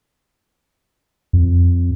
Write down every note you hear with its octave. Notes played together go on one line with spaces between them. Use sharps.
F2